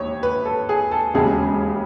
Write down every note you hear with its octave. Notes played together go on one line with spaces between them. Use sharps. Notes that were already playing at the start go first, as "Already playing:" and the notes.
Already playing: E1 D#2 C#5
B4
A4
G#4
A4
E1 D#2 C#3 G#3 G#4